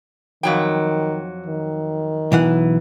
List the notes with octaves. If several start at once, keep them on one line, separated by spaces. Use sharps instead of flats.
F2 D#3 F#3 G5
D#3
B1 E3 F#5